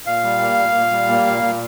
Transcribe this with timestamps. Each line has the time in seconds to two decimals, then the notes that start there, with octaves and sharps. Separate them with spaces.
0.06 A#2 F5
0.23 G3
0.40 A#3
0.58 A#2
0.75 A#2
0.92 G3
1.09 A#3
1.26 A#2
1.43 A#2